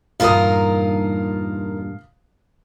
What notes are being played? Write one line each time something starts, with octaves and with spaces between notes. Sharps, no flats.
E2 G2 A#2 D#4 F4 A#4 F5 D#6